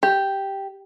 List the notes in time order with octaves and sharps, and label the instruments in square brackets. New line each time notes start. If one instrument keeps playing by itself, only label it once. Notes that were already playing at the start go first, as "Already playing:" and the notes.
[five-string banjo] G4